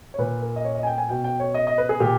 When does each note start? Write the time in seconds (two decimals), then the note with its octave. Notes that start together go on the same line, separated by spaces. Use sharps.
0.14 C#5
0.18 A#2 B4
0.42 A#4
0.56 D#5
0.65 C#5
0.75 D#5
0.83 G#5
0.87 G5
0.98 G#5
1.09 B2 G5
1.24 G5
1.40 C#5
1.54 D#5
1.67 D#5
1.78 B4
1.89 G#4
2.00 A#2 G4